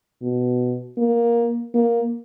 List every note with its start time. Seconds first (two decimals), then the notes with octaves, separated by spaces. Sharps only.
0.22 B2
0.98 A#3
1.74 A#3